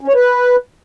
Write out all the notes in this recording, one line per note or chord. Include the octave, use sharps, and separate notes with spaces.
C#4
C#5
B4